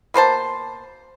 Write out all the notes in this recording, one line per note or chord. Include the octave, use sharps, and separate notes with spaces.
B2 A#3 C5 A5